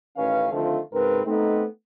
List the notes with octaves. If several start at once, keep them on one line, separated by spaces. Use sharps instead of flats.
A1 D#3 C#4 B4 F5
D3 D#3 F3 A3 C4 F4
G#2 C#3 C4 A#4 B4
A3 B3 C4 D#4